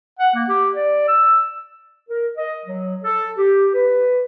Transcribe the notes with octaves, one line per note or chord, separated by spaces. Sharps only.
F#5
A#3
G4
D5
E6
A#4
D#5
F#3
A4
G4
B4